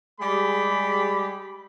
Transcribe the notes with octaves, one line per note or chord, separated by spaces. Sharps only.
G3 G#3 G4 G#4 B5